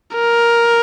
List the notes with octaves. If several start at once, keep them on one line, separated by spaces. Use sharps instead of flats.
A#4